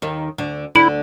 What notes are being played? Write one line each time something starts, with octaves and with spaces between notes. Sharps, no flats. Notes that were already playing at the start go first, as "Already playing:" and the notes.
D#2 D#3
D2 D3
D2 D3 E4